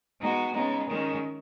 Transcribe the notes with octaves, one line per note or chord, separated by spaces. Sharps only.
G#3 B3 D#4 F#4
C#3 G#3 B3 D#4
D#3 G#3 C#4